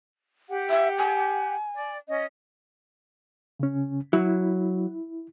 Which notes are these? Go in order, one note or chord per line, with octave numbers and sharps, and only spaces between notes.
G4 F#5
E5
G#5
D5
C#4 D#5
C#3 C#4
F#3 E4